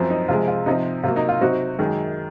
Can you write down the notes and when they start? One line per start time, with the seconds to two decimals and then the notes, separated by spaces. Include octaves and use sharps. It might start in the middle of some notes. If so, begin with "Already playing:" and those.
Already playing: F#2 F3 C4
0.10 D#4
0.28 C3 F3 G#3 F4
0.48 F4
0.66 C3 F3 C4 D#4
1.03 C3 F#3 A#3 F4
1.16 D#4
1.29 F4
1.41 C3 F#3 C4 D#4 F#4
1.79 F#2 D#3 G#3